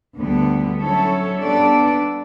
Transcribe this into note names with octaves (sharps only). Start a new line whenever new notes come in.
D2 D3 G3 B3
F#3 C#4 E4 A4 C#5
G3 B3 D4 A4 D5